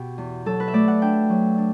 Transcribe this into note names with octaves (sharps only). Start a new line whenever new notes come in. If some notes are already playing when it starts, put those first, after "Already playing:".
Already playing: B2 G4
E2
F#3 A4
B4
E5
A3 D5
F#5
D4 G5
F#3
D4